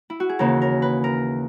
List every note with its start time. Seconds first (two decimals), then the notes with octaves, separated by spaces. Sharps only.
0.10 E4
0.20 F#4
0.29 G#4
0.39 D#2 C#3 E3 A#3 A#4
0.62 A#4
0.82 B4
1.04 A#4